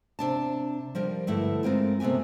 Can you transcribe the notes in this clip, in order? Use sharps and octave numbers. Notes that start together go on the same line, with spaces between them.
C3 D4 A5
F3 G3 A#4
G2 D3 A3 E4
G#3 C4 F4 A#4
C3 A3 B3 G4 G#5